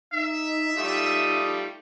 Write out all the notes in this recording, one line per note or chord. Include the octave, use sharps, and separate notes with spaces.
D#4 E5
G3 A3 D#4 F4 D#6